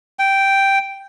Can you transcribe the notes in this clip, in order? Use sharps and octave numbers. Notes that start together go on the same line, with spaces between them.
G5